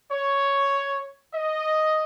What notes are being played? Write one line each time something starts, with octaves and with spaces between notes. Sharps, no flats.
C#5
D#5